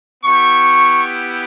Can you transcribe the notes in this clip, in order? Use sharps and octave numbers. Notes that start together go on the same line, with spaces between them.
B3 E4 G4 C#6